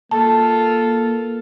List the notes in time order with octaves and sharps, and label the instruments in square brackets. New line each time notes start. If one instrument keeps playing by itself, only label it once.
[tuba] A#3 [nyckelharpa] F4 A4 [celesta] A5